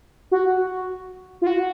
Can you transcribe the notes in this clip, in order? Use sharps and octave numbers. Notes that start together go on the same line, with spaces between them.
F#4
F4
F#4